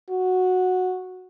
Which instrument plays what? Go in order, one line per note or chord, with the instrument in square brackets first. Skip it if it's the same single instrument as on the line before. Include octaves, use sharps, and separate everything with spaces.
[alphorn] F#4